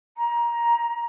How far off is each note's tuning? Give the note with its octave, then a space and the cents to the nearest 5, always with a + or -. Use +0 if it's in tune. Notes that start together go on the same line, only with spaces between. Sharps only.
A#5 +20